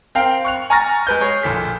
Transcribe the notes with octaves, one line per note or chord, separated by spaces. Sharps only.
C4 A#4 F5 G5
C#6 F#6 F7
G#5 A#5 C#6 F6 A6 A#6
G#3 B4 G6
G#4 C#5
A#1 A#2 A4 B6